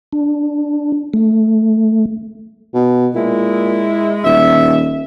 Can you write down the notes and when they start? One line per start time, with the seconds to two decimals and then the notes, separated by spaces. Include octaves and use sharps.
0.13 D4
1.14 A3
2.74 B2
3.15 A#2 G#3 E4
4.24 D#1 E5